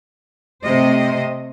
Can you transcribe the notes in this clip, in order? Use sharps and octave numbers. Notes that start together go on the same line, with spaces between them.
C3 A3 C5 D#5